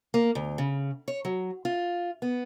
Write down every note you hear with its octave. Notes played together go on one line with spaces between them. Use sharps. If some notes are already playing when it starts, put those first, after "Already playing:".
A#3
D2
C#3
C#5
F#3
F4
B3